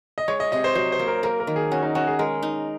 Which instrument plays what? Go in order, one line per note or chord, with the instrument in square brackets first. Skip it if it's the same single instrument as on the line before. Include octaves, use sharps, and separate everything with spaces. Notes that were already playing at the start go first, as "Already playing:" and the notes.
[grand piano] D#5
[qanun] G#3 [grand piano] C#5
[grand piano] D#5
[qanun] C3 [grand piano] D#5
[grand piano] C5
[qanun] F#3 [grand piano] C5
[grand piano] C5
[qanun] A#3
[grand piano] A#4
[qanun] A#3 [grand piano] A#4
[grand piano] A#4
[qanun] D#3
[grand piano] G#4
[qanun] C#4 [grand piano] F#4
[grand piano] D#4
[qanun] C#4 [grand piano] F#4
[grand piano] G#4
[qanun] G#3 [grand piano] A#4
[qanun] D#4